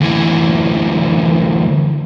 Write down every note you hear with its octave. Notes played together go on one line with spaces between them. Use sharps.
D2 E3